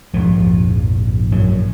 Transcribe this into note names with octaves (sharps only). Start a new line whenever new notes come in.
A#1 F2 G#2 F3
F#2 F#3